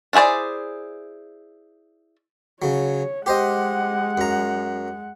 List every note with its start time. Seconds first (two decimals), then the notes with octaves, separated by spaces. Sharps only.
0.13 D4 E4 G#4 C5 D5
2.62 C#3 F#3 C#5
3.26 G#3 G4 C5 D#5 F#5
4.18 F#2 A#5